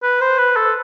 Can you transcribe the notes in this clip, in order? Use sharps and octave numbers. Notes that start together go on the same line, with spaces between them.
B4
C5
B4
A4